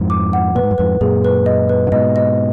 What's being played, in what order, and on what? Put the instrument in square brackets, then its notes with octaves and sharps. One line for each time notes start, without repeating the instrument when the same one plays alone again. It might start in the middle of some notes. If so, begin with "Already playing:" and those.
Already playing: [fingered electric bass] F2 G#2
[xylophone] D6
F#5
[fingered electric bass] A#2 [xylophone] B4
[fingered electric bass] G#2
F#2
[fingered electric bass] F2 G#2 [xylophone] B4
[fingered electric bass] F#2 A#2 [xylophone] G#4
[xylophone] B4
D#5
B4
[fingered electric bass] D3
[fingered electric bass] G#2 B2 [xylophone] D#5
[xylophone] D#5